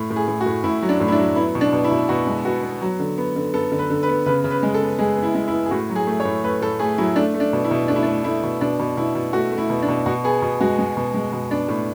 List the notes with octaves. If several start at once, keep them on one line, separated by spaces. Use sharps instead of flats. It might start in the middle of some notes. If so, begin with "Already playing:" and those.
Already playing: A2
A2
G#4
A2
F#4
A2
A2 E4
F#3
D4
A2
E4
D4
F#3
B3 E4
B2
D4
B2
E4
B2
B2 F#4
G#3
B3 F#4
B3
F#3
D3
B3
D3
B3 A4
D3
B4
D3
B4
B3
C#3 B4
C#3
B4
G#3
A4
B3
G#3 G#4
B3
E4
G#3
E4
B3
G#4
A2 F#4
F#3
G#4
A3
C#5
A2
A3 B4
A2 A4
A3 G#4
F#3 E4
A3 D4
A3
D4
B2
E4
B2
A3 D4
E4
D4
A3
A3 E4
B2
B2 D4
B2
B2 E4
B2
A3 F#4
A3
E4
B2
D4
B2
B2 F#4
B3 G#4
B2
G#3 F#4
G#3
B2
G#3
B2
B3 D4
A2